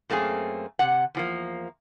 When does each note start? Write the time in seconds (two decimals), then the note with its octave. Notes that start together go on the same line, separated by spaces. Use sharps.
0.09 F#2 A3 A#3 C4 G#4
0.79 C3 F#5
1.15 E2 F3 A#3